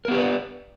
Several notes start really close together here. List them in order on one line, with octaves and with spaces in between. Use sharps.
A#4 B3 G4 B4 D5